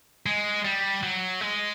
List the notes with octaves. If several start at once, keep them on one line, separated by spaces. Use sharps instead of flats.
G#3
G3
F#3
G#3